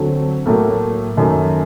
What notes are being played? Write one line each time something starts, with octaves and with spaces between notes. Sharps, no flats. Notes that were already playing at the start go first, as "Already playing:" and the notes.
Already playing: D2 D3 F#3 A3 C4
A2 F#3 A3 A#3
F#2 D#3 A3